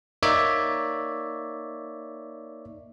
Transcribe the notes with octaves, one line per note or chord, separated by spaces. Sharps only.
A#3 D#4 C#5 D5 E5